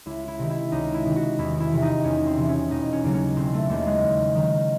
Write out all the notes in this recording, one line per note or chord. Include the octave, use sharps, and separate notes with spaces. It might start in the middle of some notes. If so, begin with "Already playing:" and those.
C#2 E4
E4
C3 D#3
E4
C#2 D#4
E4
C3 D#3
F#4
E2 E4
E4
C3 E3
D#4
E2 C#4
C4
C3 E3
C#4
E1 D#4
C#4
D#2 C#3 F#3
C#4
E1 C4
A3
D#2 C#3 F#3 A3
G#3
E2
D#3 F#3